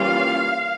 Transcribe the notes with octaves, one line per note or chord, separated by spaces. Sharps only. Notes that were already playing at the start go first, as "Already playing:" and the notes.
Already playing: E3 G3 A#3 C#4 F4 F5